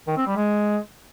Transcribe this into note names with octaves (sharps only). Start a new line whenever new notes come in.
D#3
C4
G3
G#3